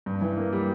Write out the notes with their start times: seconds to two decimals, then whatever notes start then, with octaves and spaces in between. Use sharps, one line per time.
0.06 G2
0.21 E3
0.37 A#3
0.53 G3